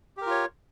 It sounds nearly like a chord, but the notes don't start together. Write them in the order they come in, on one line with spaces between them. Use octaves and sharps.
G4 A#4 F4 C#5